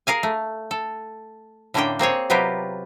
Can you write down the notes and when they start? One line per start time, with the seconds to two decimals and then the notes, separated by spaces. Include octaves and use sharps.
0.07 G#4 A#4 F5 G#5
0.23 A3
0.71 A4
1.74 A2 D3 A#3 C#4 D4 G5
1.99 A#3 C4 G#4 C#5
2.30 C3 F#3 B3 F4 G4 A#4